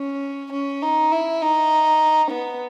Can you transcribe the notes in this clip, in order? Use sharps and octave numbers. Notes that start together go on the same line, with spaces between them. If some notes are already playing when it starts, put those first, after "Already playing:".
Already playing: C#4
C#4
D#4
E4
D#4
B3